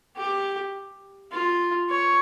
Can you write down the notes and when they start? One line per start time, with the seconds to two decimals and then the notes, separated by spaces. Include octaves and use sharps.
0.17 G4
1.32 F4
1.90 C#5